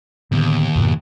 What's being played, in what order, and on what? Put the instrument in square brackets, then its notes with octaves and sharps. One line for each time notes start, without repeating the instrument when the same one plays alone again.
[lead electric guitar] D#2 [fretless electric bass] A2 D3 B3
[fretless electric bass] F2 G#2 B2